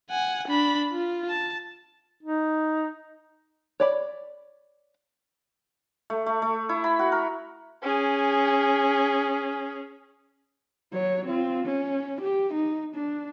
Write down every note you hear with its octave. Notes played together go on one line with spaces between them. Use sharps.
F#5 G#5
D4 B5
F4
A5
D#4
C#5 D5 B5
A3
A3
A3
E4
B5
F#4
A#4
C#4 G#4
F#3 C#5
C4 F4
C#4
G4
D#4
D4